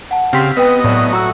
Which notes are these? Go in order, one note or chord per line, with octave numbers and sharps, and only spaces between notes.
F#5 A5
C#3 C4 G4 F5 G5 C6 B6
B3 B4 D#5 G5
A2 F#3 D5
F#4 A#5 E6